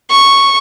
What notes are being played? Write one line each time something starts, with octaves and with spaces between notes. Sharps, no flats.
C#6